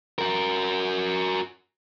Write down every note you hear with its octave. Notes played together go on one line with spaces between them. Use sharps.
F#4 A#4